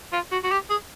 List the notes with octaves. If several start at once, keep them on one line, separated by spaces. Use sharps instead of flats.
F4
F#4
F#4
G4
G#4